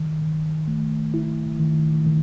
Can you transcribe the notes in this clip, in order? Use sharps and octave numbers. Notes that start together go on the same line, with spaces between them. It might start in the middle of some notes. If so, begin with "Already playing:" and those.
Already playing: D#3
D#3
A3
E4
D#3
D#3